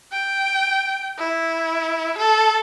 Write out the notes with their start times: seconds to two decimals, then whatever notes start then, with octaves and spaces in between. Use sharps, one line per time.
0.12 G5
1.18 E4
2.18 A4